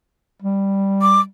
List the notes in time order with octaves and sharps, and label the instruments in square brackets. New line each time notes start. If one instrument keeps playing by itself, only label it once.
[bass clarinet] G3
[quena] D6